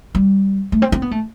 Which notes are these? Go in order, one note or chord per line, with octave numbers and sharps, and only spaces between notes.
G3
A3
C4
C4
B3
A3